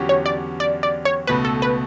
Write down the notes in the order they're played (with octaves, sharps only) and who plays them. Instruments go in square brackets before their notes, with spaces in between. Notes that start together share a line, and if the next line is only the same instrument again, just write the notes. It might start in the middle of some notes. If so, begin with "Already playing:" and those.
Already playing: [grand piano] E2 D3 F#3 C#4 G4
[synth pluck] C#5
D5
D5
D5
C#5
[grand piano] C#2 B2 A3 [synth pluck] B4
[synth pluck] A4
B4